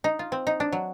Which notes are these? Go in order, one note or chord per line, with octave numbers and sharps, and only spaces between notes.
D#4
F4
C4
D#4
D4
F#3